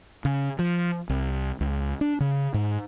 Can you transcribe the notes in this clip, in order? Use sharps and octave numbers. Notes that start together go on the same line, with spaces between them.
C#3
F3
C2
C#2
D4
C#3
G#2